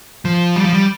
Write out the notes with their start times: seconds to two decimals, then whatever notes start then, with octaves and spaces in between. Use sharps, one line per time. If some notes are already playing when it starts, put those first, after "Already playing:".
0.25 F3
0.56 G3
0.64 F3
0.73 G3